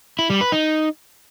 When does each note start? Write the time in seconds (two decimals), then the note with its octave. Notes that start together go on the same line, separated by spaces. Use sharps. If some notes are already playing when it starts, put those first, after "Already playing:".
0.19 E4
0.30 G3
0.41 B4
0.52 D#4